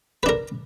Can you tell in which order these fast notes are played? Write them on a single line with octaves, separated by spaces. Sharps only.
B4 D4 A#4